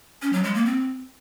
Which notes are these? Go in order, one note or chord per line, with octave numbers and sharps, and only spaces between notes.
C#4
F#3
G#3
A#3
C4